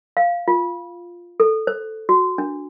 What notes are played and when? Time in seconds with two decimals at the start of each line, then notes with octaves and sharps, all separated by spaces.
0.17 F5
0.48 F4
1.40 A4
1.67 C5
2.09 F#4
2.38 D4